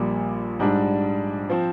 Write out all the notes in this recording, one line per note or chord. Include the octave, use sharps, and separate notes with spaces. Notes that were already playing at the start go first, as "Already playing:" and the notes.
Already playing: A#1 A#2 G3
G#2 G3 D4
F3 C4